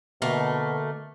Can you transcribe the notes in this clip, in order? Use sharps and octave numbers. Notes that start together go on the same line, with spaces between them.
B2 D3 A3 A#3